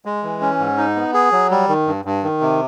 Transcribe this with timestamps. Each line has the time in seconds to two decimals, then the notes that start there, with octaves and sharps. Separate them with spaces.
0.05 G#3
0.23 E3
0.41 C#4
0.59 G#2
0.78 D#4
0.96 B3
1.14 G#4
1.32 F#3
1.51 G3
1.68 D#3
1.87 G2
2.05 G2
2.23 D#3
2.41 C3